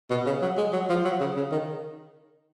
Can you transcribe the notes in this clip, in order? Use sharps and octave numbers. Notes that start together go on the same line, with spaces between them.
B2
C#3
F#3
G#3
F#3
F3
F#3
C#3
C#3
D#3